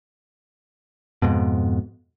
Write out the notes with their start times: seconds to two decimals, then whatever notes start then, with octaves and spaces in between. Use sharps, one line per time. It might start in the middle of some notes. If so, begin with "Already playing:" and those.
1.22 F2 G#2 B2